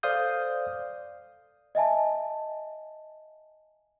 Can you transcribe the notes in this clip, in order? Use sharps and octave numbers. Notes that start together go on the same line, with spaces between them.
A4 C5 D5 F5 D#6 G6
D#5 E5 G#5 A5